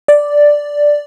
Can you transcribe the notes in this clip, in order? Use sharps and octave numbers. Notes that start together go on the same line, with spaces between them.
D5